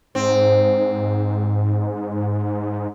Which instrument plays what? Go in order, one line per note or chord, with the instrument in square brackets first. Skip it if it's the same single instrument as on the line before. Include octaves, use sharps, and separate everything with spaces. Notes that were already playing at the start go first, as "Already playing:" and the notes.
[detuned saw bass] G#2 [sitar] C4